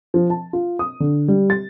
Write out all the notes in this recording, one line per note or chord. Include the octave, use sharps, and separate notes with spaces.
F3
A5
F4
D#6
D3
G3
A6